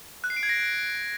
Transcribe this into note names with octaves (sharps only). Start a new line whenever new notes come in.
F#6
C7
D7
G#6
A#6